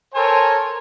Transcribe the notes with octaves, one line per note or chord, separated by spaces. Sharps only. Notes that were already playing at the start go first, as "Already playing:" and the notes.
A4 A#4 C5 C#5 G#5